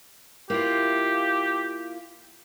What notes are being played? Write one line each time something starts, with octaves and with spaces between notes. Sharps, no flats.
A#3 E4 F4 G4